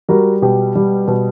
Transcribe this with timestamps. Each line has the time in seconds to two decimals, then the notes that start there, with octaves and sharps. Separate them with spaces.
0.09 G3 F#4 A#4
0.42 B2 G4
0.75 G3
1.08 B2